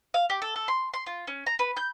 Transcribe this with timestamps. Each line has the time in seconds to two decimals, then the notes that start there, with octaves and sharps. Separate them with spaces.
0.14 F5
0.30 G4
0.42 A4
0.56 A4
0.68 C6
0.94 C6
1.06 F4
1.27 C#4
1.46 A#5
1.59 B4
1.77 G6